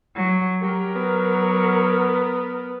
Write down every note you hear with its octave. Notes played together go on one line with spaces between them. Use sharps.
F#3
F#3 G4 A#4
B3